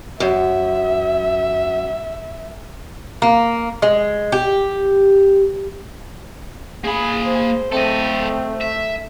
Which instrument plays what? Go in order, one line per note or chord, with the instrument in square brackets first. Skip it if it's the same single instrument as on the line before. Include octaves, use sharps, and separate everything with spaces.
[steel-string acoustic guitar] F#2 [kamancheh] E5
[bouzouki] A#3
G#3
G4
[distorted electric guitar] A#3 B5 [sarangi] G#4
[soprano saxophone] C5
[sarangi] A3 [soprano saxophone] C4 [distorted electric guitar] A4 D#5
[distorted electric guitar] E5